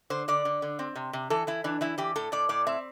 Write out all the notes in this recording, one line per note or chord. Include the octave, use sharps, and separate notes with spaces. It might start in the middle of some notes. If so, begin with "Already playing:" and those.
D3 C5
D3 D5
D3
D3
C4
C3
C3
E3 A4
E3 E4
E3 D4
E3 E4
E3 G4
A2 A4
A2 D5
A2 D5
C4 E5